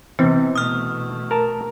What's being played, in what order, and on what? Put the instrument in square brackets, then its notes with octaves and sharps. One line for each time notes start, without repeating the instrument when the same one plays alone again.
[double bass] C3 [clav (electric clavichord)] E3 [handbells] B3 [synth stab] C4
[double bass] B2 A3 [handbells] D#6 F6
[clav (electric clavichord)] A#4 A5